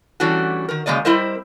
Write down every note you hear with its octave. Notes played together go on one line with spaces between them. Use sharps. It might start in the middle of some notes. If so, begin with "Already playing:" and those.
E3 G3 A3 C#4 D4 F#4
D#3 A#4
C#3 G#3 A#3 D5 D#5
G3 C4 E4 A#4 C5 D#5